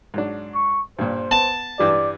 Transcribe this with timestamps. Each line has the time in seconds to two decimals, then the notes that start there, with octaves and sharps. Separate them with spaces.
0.14 G#2 F#3 D4
0.55 C#6
0.99 G2 A#2 C5
1.31 B3 A5
1.79 G2 E3 G3 D5